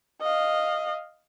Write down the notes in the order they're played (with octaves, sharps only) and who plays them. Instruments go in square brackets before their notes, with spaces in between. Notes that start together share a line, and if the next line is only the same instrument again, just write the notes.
[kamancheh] D#5 F5